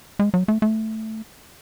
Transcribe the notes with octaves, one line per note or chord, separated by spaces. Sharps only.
G#3
F#3
A3
A3